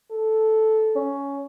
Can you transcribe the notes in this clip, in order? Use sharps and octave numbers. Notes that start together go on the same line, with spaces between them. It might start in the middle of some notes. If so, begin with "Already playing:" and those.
A4
C#4